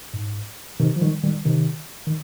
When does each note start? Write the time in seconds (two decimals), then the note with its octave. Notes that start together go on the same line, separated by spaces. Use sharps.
0.14 G#2
0.80 C3 D#3
0.96 F3
1.02 D#3 G3
1.24 D#3 G3
1.45 C3 D#3
2.07 D#3